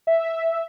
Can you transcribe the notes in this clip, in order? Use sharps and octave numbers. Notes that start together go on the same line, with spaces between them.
E5